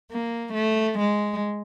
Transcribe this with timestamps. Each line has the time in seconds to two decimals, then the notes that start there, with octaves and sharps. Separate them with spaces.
0.10 A#3
0.54 A3
0.98 G#3